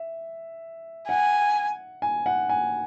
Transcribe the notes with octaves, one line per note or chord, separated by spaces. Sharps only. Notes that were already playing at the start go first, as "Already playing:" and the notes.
Already playing: E5
F#5 G#5
G#5
F#5
G#5